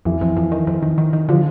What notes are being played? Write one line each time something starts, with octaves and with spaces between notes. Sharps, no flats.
F2 E3
F2
F2
D#3
F2
D#3
D#3
D#3
D3 F3